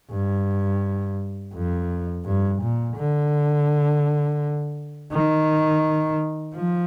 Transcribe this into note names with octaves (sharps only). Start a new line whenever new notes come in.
G2
F2
G2
A#2
D3
D#3
F3